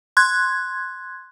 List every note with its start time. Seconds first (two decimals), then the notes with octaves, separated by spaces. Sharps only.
0.17 C6 F#6 G#6